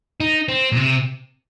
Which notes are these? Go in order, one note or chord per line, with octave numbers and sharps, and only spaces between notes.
D#4
C4
A#2
C3